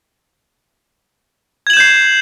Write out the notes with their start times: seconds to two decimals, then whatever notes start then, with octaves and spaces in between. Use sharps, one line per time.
1.67 G#6
1.70 F#7
1.73 E7
1.77 G6
1.80 C7